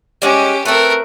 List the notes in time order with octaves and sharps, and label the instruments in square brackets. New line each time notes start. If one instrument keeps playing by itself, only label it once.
[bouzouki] G3 G#3 [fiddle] C#4 G4
[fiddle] A3 A#4 [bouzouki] C4 B4